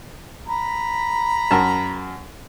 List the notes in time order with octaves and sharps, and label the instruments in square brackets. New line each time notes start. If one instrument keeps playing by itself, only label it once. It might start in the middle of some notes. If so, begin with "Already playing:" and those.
[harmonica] A#5 B5
[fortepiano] F#2 A#4 A5